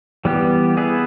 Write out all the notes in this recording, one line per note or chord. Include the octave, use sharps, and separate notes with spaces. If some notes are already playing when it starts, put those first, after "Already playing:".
E3 G3 B3 G4
B3 E4 G#4 B4